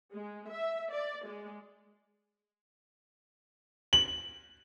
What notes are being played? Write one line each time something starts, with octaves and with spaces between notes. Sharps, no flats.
G#3
E5
D5
G#3
F#7